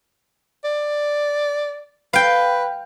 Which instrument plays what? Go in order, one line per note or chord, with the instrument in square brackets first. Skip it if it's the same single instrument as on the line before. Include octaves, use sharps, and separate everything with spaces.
[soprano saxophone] D5
[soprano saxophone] B4 [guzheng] F5 G5